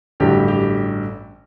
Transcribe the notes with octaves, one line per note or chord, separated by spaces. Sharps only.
A1 G2 D3 F#3 G4
G4